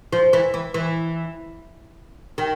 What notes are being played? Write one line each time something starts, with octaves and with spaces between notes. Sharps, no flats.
F3
E3
E3
E3
D#3